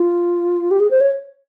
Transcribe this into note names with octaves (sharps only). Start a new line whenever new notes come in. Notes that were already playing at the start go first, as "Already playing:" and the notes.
Already playing: F4
G4
G#4
C5
C#5